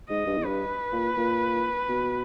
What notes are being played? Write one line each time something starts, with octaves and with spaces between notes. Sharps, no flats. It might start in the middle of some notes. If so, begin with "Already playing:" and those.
G#2 D#5
G2
E2
G2 B4
A#2
A#2
B2